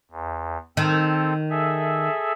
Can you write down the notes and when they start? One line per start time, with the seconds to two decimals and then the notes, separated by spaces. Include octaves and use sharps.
0.11 E2
0.77 D#3 C4 A4
1.50 G#4 A4 E5